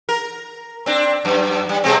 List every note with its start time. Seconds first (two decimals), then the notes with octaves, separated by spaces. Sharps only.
0.09 A#4
0.86 C4 D4
1.25 F#2
1.69 G3
1.84 B2 G#3 C4